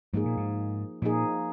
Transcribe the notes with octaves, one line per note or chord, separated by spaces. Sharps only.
G#2 F3 A#3 D#4 G#4
A#2
G#2
A#2 F3 A#3 D#4 G#4